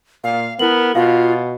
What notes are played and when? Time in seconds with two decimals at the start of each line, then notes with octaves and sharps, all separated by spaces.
0.24 A#2 F5
0.59 B3 E4 A#4 F#7
0.95 B2 F4 F5